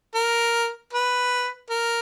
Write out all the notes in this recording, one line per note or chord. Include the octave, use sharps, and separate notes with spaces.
A#4
B4
A#4